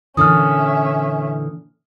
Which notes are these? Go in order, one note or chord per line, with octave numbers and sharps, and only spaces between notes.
A#2 D3 E3 C#4 E5 D#6 F6